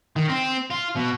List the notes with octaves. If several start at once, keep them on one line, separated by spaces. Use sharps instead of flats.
D#3
C4
F4
B2